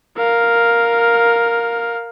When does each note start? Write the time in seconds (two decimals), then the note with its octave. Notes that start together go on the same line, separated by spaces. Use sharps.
0.17 A#4 F5